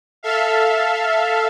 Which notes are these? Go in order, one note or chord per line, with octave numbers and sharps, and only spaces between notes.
A4 E5 F5